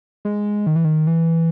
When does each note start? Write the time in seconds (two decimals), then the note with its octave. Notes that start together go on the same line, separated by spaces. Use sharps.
0.25 G#3
0.67 D#3
0.76 E3
0.85 D#3
1.07 E3